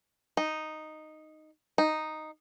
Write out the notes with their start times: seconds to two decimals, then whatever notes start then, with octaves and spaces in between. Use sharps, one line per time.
0.37 D#4
1.78 D#4